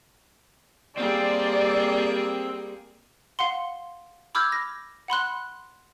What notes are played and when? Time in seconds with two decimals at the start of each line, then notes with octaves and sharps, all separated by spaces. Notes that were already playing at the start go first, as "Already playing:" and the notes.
0.97 G3 A#3 C4 G#4 D5
3.39 F5 F#5 C6
4.35 B5 D6 E6 F6 G6 G#6
4.52 A#6
5.08 F#5 B5 C6 F#6